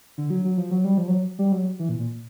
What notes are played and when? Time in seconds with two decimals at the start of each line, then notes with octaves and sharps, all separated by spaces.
0.18 D3
0.30 F#3
0.45 F#3
0.58 F3
0.71 F#3
0.85 G3
0.98 F3
1.08 F#3
1.39 G3
1.52 F#3
1.79 E3
1.89 A#2
1.99 A#2